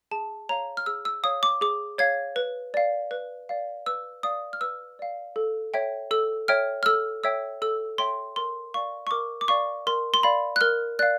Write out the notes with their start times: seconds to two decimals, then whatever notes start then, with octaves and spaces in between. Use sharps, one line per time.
0.11 G#4 A5
0.49 C#5 F5 A#5
0.77 F6
0.86 G#4 E6
1.05 E6
1.23 C#5 F5 D#6
1.43 D6
1.61 G#4 D6
1.98 C#5 F5 G#6
2.36 B4
2.74 D5 F5
3.11 B4
3.49 D5 F5
3.86 B4 E6
4.23 D5 F5 D#6
4.53 F6
4.61 B4 E6
4.99 D5 F5
5.36 A4
5.74 C#5 E5 G5
6.11 A4 E6
6.48 C#5 E5 G5 F6
6.83 F6
6.86 A4 E6
7.24 C#5 E5 G5 E6
7.62 A4 E6
7.98 C#5 E5 G5 C6
8.36 A#4 C6
8.74 D5 F5 C#6
9.07 C#6
9.11 A#4 D6
9.41 D6
9.48 D5 F5 C#6
9.87 A#4 C6
10.14 C6
10.23 D5 F5 B5
10.56 F#6
10.61 A#4 F6
10.99 D5 F5 F#6